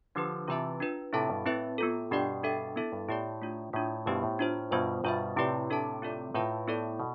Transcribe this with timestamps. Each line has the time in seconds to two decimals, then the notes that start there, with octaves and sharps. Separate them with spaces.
0.15 D3 F3 D4 G4 B4
0.48 C3 E3 F4 B4 E5 A5
0.80 D4 F4 B4
1.13 A2 C3 E4 A4 E5 A5
1.29 G2 B2
1.46 A2 C4 E4 B4 E5
1.78 B3 F4 A4
2.11 G2 B2 D4 G4 D5 G5
2.43 D4 A4 E5 G5
2.76 B3 E4 A4 E5
2.92 G2
3.09 A2 E4 G4 D5
3.42 A3 D4 F4
3.73 A2 A3 D4 F4
4.06 G2 B2 B3 E4 G4 C5
4.23 A2
4.39 D4 F4 C5
4.71 G2 B2 B3 F4 C5
5.04 G2 B2 F4 C5 E5
5.36 A2 C3 E4 G4 B4 D5
5.70 D4 A4 E5 A5
6.02 C4 F4 A4 D5
6.34 A2 F4 B4 F5 A5
6.68 B3 E4 A4 D5
7.00 B2